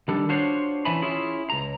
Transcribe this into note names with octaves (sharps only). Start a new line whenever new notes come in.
D#3 G3 D4 A4
D4 F4 F#4 C5 C#5
E3 C#4 E5 G#5 A5 B5
C#4 E4 F4 G#4
C#2 A#5